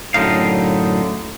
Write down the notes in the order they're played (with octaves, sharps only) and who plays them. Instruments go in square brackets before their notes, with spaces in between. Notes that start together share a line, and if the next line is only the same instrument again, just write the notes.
[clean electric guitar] F#2 A2 D3 D#4 F5